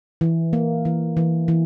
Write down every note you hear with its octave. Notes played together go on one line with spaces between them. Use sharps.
E3
A#3
E3
E3
E3